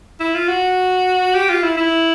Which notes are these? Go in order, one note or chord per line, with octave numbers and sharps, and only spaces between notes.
E4
F4
F#4
G4
F4
E4
E4